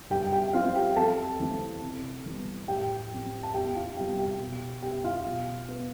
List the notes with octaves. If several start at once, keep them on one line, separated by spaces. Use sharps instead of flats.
G2 G4 G5
G4 G5
F3 C4 F4 F5
G4 G5
F2 A4 A5
E3 A3 C4
C3
E3 G3 B3
A2 G4 G5
F3 C4
A5
E2 G4 G5
F4 F5
C3 G3 B3 G4 G5
G4 G5
B2
B3 G4 G5
F4 F5
B2
B3